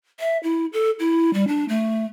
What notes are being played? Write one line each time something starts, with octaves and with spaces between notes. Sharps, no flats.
E5
E4
A4
E4
G3
D4
A3